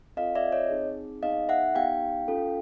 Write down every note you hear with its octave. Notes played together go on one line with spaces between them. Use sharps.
C4 F4 A4 D#5 F5
D5 E5
C#5 D#5
C4 D#4 G#4
B3 D#4 G#4 D#5 F5
E5 F#5
B3 D#4 G4 F5 G5
C#4 F4 A4